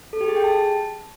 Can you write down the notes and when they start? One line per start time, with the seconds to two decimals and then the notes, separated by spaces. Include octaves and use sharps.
0.13 A4
0.21 G4
0.28 G#4
0.36 G5
0.44 A5